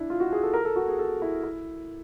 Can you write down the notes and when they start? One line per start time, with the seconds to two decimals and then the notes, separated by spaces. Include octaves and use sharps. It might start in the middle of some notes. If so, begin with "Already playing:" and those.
Already playing: D4 E4
0.10 F4
0.20 F#4
0.32 G#4
0.43 A4
0.54 A#4
0.65 A4
0.76 F#4
0.88 G#4
0.99 A4
1.22 E4
1.43 E4